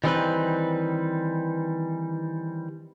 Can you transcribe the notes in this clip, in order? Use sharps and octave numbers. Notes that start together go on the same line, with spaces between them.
D#3 E3 G3 C4 D#4 B4